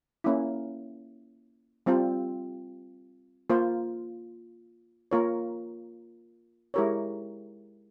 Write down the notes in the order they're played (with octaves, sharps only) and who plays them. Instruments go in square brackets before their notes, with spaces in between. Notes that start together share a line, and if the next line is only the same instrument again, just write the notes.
[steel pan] A#3 C#4 E4
G3 C4 F4 C5
A#3 F4 C5
A#3 F4 A#4 C#5
G#3 E4 G4 A#4 C#5